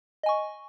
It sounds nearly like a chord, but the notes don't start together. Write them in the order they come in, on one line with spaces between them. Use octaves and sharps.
D#5 G#5 C#6